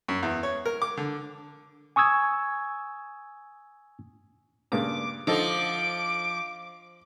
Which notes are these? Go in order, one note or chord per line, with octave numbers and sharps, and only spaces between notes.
F#2
E2
C#5
A#4
D6
D3
G#5 C#6 D#6 E6 G#6
G2 A#2 C#3 D6
D3 F3 D#4 A4 D6